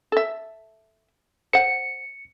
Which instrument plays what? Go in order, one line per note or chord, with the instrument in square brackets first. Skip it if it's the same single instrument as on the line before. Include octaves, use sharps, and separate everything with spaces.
[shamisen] A4 E5
[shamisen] C5 F#5 [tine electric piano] C#7